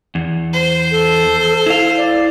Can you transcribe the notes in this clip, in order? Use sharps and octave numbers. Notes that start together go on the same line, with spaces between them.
E2
C5
A4
E4 F5
D5